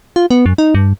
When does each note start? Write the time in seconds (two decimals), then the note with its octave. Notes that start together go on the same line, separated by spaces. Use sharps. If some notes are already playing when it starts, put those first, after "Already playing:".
0.16 F4
0.31 B3
0.46 F#2
0.58 D#4
0.75 G2